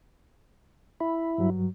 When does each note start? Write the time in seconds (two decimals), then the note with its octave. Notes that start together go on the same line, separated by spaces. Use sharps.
1.00 E4 B5
1.38 G2 F#3